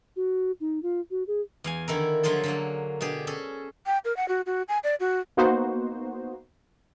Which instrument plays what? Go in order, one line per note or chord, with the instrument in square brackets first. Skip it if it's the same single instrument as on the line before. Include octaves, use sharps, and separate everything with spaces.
[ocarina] F#4
D#4
F4
F#4
G#4
[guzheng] E2 F5 G#5
D3 D#3 E4 A#4
D3 F3 F#3 F4 G#4 A4
D3 F#3 A#3
B2 D4 G4 G#4
C#4 G#4 A4
[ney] G5
A#4
F#5
F#4
F#4
G#5
D5
F#4
[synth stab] A#3 B3 D#4 F#4 C5